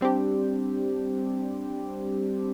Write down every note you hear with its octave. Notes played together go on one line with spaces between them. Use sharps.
G3 C4 D4 G4